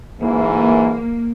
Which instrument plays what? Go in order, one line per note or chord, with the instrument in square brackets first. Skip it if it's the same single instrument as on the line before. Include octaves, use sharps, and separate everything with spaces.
[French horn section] D2 G#2 E3 [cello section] A#3